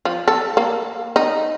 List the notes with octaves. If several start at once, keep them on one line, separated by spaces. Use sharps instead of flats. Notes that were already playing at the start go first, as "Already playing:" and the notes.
F3
A4
A#3
D#4